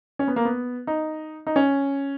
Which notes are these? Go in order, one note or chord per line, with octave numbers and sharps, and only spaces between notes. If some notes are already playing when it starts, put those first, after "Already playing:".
C#4
B3
A#3
B3
D#4
D#4
C#4